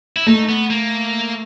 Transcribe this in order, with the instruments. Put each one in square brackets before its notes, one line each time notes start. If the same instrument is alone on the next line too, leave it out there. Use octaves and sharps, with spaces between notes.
[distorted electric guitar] E4
[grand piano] A3 [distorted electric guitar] D#4
[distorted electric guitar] B3
A#3